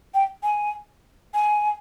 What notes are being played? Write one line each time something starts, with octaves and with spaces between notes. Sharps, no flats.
G5
G#5
G#5